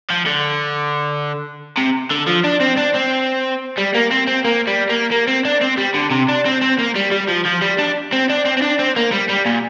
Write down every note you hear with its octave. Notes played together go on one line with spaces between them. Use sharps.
F3
D3
C3
D3
F3
D4
C4
D4
C4
G3
A#3
C4
C4
A#3
G3
A#3
A#3
C4
D4
C4
G3
D3
C3
D4
C4
C4
A#3
G3
G3
F3
F3
G3
D4
C4
D4
C4
C4
D4
C4
A#3
G3
G3
A#2